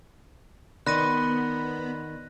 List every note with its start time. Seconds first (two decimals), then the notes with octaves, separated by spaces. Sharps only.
0.86 D#3 B3 D5 B5 C6 F#6 A#6 D#7